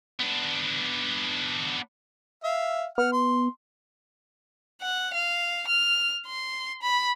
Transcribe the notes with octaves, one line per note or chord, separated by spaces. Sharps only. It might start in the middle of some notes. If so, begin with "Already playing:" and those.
B3 D4
E5 F5
B3 F#5 F6
C6
F#5
F5
F6
C6
B5